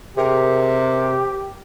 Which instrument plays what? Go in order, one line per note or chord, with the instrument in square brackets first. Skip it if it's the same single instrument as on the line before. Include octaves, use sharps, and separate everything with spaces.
[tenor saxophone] C3 [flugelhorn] G4 [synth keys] G#4 A#4